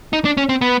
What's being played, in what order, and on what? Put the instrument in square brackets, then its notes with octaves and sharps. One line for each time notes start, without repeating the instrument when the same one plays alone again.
[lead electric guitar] D#4
D4
C#4
C4
B3